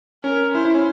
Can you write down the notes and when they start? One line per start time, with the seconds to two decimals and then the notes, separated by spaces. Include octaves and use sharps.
0.23 C#4 A#4
0.55 E4 C5
0.65 E4
0.74 C#4